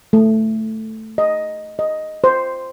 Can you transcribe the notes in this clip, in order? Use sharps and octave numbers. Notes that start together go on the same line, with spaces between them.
A3
D#5
D#5
C5